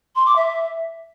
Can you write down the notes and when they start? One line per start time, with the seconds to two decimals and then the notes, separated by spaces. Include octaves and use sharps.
0.16 C6
0.26 D6
0.36 E5